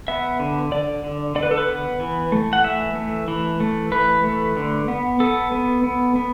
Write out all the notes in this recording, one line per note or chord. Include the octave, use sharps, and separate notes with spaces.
B3 E5
D3
D3 D5
D3
D3 D5
B4
A4
B4
B3
E3
A3
F#5
E3 E5
A3
E3
A3
E3 B4
A3
D3
B3
B3 A4
B3
B3
B3